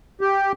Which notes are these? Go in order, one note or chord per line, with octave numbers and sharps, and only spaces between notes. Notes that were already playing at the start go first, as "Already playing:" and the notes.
G4